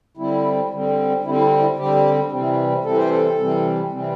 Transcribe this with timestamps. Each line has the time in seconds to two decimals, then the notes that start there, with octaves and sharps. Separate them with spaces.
0.17 D3 G3 C4 E4
0.71 D3 G3 C4
1.24 D3 G3 C4 E4
1.35 E4
1.42 D4
1.60 E4
1.78 D3 G3 C4 G4
2.31 C3 E3 G3 C4
2.84 C3 E3 G3 C4 A4
2.97 C5
3.09 A4
3.38 C3 E3 G3 C4
3.91 C3 E3 G3 C4